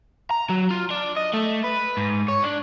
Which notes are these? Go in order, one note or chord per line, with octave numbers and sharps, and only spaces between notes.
A#5
F#3
F4
D4
D#5
A3
B4
G#2
C#5
D4